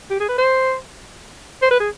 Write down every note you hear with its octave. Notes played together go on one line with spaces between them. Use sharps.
G4
G#4
B4
C5
C5
B4
G#4